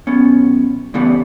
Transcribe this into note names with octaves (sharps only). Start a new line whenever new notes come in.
B1 B3 C#4
A2 C#3 E3 G3 B3